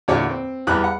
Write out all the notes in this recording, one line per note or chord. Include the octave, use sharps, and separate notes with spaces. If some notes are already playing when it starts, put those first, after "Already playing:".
E2 A#2 D3 F#4 C#5 D5
C4
E2 E3 G3 D#6 F#6
F#5